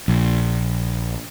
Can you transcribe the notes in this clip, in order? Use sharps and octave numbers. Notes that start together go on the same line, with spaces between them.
A#1